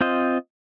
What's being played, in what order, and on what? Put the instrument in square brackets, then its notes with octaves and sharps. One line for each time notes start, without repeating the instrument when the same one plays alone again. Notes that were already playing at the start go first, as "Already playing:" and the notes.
[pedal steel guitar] C4 F4 C5 D#5